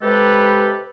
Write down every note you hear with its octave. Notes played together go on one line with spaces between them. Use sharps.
C3 G#3 G4 A4 B4